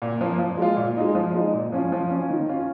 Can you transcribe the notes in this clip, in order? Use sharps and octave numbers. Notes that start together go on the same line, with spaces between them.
A#2
F3 A#3
F3
G#3 F4
A#2
G#3 D#4
F3
G#3 D#4
A#2
F3 C#4 F4
F3
C#4 F4
D#3
C#4 F4